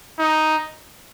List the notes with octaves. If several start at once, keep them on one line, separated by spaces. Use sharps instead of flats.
D#4